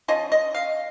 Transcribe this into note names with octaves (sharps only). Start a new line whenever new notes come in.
F3 C#4 F4 D#5
D#5
F5